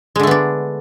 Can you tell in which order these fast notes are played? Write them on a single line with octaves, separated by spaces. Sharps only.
G#3 D3 A3 B3 D4